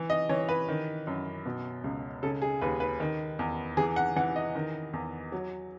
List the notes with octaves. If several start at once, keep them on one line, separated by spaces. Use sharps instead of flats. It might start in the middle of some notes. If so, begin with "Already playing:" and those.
Already playing: E3
D#5
E3 C#5
B4
D#3
F#2
B2
C#2
C#3 A4
G#4
D#2 B4
B4
D#3
E2
E3 G#4
F#5
E3 F#5
D#5
D#3
E2
F#3